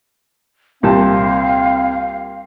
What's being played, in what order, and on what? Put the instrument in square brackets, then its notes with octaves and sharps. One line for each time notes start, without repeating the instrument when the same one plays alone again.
[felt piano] C2 [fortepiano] A#2 G3 A5 [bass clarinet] C4 [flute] F5